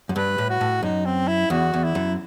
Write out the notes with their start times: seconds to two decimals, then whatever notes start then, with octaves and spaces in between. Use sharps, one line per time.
0.09 F#2
0.16 G2 B4
0.38 A2
0.49 F#4
0.61 A2
0.83 F#2 D#4
1.06 C4
1.28 E4
1.50 E2 F#4
1.74 E2
1.84 E4
1.95 F#2